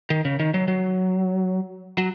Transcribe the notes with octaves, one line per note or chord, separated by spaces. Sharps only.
D#3
C#3
D#3
F#3
F#3
F#3